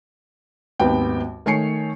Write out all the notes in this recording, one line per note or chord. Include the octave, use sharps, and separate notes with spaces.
G#1 D#2 B3 G5
D#3 A3 C#5 G#5 C7 C#7